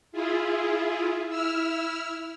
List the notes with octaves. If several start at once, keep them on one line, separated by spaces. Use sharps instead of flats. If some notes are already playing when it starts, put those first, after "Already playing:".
E4 F4 G#4
E4 E6 F6